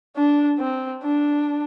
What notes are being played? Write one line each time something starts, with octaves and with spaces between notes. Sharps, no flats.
D4
C4
D4